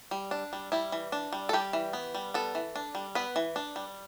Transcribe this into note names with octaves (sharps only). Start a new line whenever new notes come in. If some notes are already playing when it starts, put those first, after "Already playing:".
G3
D4
G3
G3 E4
E3
D4
G3
A4
G3 G4
E3
B3
G3
B3 A4
E3
D4
G3
B3 B4
E3
D4
G3